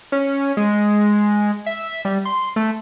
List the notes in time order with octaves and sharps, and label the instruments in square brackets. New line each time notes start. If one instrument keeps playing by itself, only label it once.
[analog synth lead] C#4
G#3
E5
G3
C6
A3